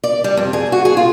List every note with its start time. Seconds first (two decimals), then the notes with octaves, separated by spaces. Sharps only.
0.04 D5
0.24 G3
0.37 F2
0.53 G#4
0.72 F#4
0.85 G#4
0.97 F4